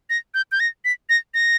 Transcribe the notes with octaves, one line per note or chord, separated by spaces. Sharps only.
A#6
G6
G6
A#6
B6
A#6
A#6